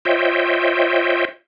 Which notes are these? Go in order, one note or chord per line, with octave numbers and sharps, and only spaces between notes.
F4 C5 C#5 D#5 E5 G5